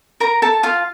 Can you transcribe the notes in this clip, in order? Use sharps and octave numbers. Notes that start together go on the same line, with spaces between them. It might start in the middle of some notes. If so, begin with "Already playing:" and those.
A#4 A#5
A4 A5
F4 F5